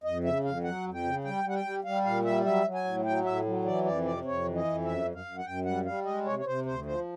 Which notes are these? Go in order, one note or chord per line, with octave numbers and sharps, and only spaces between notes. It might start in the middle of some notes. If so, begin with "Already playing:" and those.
F2 D#5
C#3 E5
F2 F5
F#3 F#5
F2
G5
C#3
G3 G5
G3
F#5
G5
G3
G3 F5
A#2 F5
G3 E5
F#3 E5
F#3
G#5
A2
F#3 G5
A2 E5
F#3
E3 D5
F2 D5
C3 D5
F2 C#5
E3
D#5
F2
F#2 E5
F#2
F5
F#2
F#5
F#2 G5
G3 F#5
G3 F5
G#3 D#5
C3 C#5
C#5
C3 C5
D2 C5
F3 C5